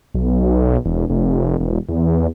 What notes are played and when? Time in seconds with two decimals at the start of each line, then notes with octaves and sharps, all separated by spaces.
0.14 B1
0.85 E1
1.10 F1
1.60 E1
1.89 E2